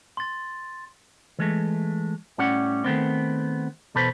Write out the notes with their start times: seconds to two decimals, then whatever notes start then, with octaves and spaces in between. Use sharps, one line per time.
0.17 C6 A6
1.39 E3 G#3 A3
2.38 A2 G3 C#4 F#5
2.84 D#3 A3 B3 C4
3.95 E2 B2 A4 B4 C5